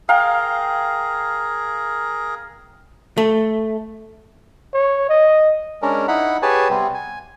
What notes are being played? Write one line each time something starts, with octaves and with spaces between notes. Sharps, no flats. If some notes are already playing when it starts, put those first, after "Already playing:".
G#4 A#4 F5 G5 A#5
A3
C#5
D#5
G#3 C#4 D4 A#4
D#4 E4 F#5 B5
G4 G#4 B4 C#5 G#5 A5
C3 G3 B3 C4
G#5